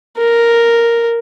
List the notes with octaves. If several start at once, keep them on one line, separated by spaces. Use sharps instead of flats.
A#4